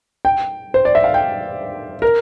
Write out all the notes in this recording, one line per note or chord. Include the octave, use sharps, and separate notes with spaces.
G5
C5
D5
E5
F5
G5
A#4